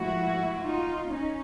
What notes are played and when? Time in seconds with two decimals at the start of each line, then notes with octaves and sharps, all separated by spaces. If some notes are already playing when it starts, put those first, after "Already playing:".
Already playing: G#2 F3 A3 E4 F#4
0.64 D#4 F4
1.11 C#4 D#4